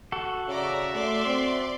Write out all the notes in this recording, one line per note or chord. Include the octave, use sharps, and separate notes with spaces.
F#4 A4
C#3 C#5 D5 E5 A#5
A3 D5 C6
C4